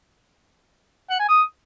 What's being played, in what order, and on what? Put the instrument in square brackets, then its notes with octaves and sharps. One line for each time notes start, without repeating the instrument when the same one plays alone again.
[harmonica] F#5
G#5
D#6